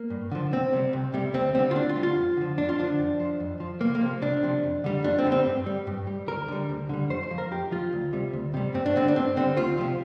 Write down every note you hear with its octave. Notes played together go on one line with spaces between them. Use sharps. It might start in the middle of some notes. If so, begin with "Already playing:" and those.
Already playing: A#3
G2
D3 F3
C2 C4
C3 G3
C2
C3 G3
D2 C4
D3 G3 C4
F4
D2 D4
F4
D3 G3
F4
F2
D3 F3
F2 D4
F4
D3 F3 D4
F2
F3
F2
F3
C2 A#3
A#3
C3 F3
C2 D4
C3 F3
F2
D3 G3
F2 D4
C4
D3 G3
C4
G2
G3
G2
G3
D2 A#4
D3 G3
D2
D3 G3
F2 C5
C5
F3
A#4
F2 G4
F3 F4
D2
C3 G3
D2
C3 G3
G2 C4
D4
D3 G3 C4
D4
G2 C4
D3 G3 C4
D2 F4
C3 F3